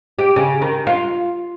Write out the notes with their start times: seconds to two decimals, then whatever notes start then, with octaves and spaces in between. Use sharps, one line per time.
0.19 G4
0.36 C#3
0.62 D#3
0.87 F4